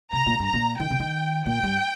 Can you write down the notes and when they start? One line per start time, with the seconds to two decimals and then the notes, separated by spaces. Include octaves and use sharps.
0.12 C3 A#5
0.26 A#2
0.40 G2
0.46 A#5
0.54 A#2
0.80 D#3 G5
0.90 C3
1.00 D#3
1.46 A#2 G5
1.63 G2